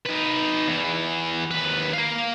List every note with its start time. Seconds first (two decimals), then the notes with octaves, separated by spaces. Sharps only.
0.05 D#4 B4
0.68 E2 E3
1.51 D#2 B4
1.93 A#3 F5